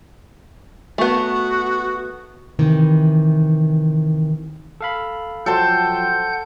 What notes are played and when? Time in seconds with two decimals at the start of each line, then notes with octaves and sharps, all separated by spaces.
0.98 A3 B3 F#4
2.59 C3 D#3 E3
4.81 A4 F5 B5
5.46 F3 F#3 A4 F#5 G5 A5 C6 G6